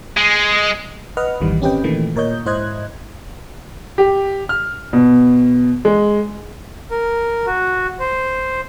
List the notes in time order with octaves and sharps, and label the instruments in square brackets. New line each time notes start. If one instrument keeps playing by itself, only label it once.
[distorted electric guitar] G#3
[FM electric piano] B4 D#5 F#5 F6
G#1 D#2 A#2 D#3 E3 G3
C4 C#4 G4 B4 D#5 G5
A#2 D#3 E3 A3
A#2 A#4 C#5 D#5 G6
G#2 E4 C5 D#5 F#6 G#6
[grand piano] G4
F6
B2
G#3
[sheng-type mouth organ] A#4
F#4
C5